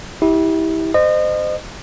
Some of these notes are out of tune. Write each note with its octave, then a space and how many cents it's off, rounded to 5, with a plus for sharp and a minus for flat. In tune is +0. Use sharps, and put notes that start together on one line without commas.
E4 -30 G4 +0
C5 -30 D#5 -30